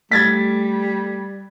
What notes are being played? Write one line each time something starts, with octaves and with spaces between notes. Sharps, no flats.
G3 A3 G#6 A6 B6